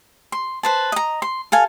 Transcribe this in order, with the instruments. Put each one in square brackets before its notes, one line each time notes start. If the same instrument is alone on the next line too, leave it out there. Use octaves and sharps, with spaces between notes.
[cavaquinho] C6
B4 C5 A5
D#5 A#5
C6
A4 F5 G#5